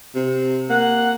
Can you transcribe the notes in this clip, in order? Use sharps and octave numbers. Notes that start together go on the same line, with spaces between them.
C3
A#3 F#5